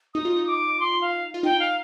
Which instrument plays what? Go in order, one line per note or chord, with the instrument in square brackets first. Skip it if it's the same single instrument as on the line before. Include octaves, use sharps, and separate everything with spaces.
[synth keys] D#4 [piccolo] D#6
[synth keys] F4
D#4
[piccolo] D6
C6
F5
[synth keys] F4
[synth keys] D#4 [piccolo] G5
[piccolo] F5